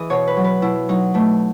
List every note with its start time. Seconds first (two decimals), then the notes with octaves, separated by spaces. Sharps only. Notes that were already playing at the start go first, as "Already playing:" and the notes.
Already playing: E3 G#4 D#5
0.10 B2 C#5
0.28 B4
0.37 F#3
0.44 B4
0.62 B2 E4
0.89 F#3 D#4
1.14 B2 A3